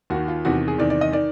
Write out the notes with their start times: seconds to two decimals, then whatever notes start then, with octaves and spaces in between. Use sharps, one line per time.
0.10 D#2 D#3 F#4
0.28 F4
0.45 E2 C3 D#3 F#4
0.68 G#4
0.78 E2 C3 D#3 D5
0.90 D5
1.01 D#5
1.13 D#3 D5